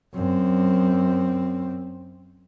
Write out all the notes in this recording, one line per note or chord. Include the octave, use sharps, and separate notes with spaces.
F#2 C4